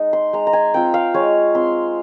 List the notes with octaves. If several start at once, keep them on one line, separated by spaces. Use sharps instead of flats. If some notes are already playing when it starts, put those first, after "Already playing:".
Already playing: G#3 D#4 D#5
C6
G#3 A#5
A#5
G#5
C4 F4 G5
F5
G#3 C#5
C4 F4 C6